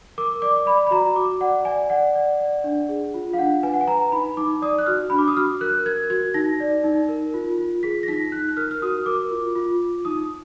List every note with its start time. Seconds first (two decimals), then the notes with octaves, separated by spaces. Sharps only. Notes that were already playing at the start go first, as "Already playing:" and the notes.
0.18 A#4 D6
0.42 D5 D6
0.56 D6
0.66 D5 B5
0.87 B5
0.91 F#4 A#5
1.15 F#4 D6
1.40 D5 F#5
1.65 D5 G#5
1.90 D5 F#5
2.15 D5
2.40 D5
2.64 D4
2.89 G#4
3.14 F4
3.33 F5
3.38 D4 F#5
3.63 B4 G#5
3.74 F#5
3.81 G#5
3.87 B4 A#5
4.12 D#4 B5
4.37 D#4 D6
4.62 D5 D#6
4.79 F#6
4.86 F#4 F6
5.10 D4 B5
5.18 D6
5.28 D#6
5.37 F#4 F6
5.61 A#4 F#6
5.86 A#4 G#6
6.10 F#4 G#6
6.34 D#4 A#6
6.60 D5
6.84 D#4
7.09 A#4
7.34 F4
7.58 F4
7.83 G#4 B6
8.03 A#6
8.08 D#4 B6
8.32 D#4 F#6
8.49 F#6
8.57 A#4 F6
8.71 F6
8.82 F#4 D#6
9.06 A#4 D6
9.31 F4
9.55 F4
9.81 F4
10.05 D#4 D#6